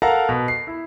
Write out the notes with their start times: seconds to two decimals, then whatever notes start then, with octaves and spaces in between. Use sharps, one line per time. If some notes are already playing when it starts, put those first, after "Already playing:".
0.02 A4 A#4 F5 F#5 A5 A#5
0.29 B2
0.48 C7
0.67 E4